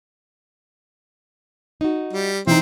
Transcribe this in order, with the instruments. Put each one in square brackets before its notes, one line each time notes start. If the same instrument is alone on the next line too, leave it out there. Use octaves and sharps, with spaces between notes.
[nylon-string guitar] D#4 F#4
[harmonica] G3
[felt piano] E3 D#4 [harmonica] C4